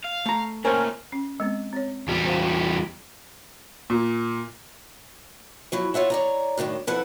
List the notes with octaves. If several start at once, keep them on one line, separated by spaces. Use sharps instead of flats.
F5
A3 A#5
A#2 A3 C#4 A#4 C5 G5
C#4
G#3 B3 C4
C4 C#5
E2 G3
C5 F5 F#5
A#2
F3 F#3 E4
F4 C#5 E5 F#5
C#5 D5 A#5
F#2 A2 D#3 D4
F2 F3 E4 A4 B4 F#5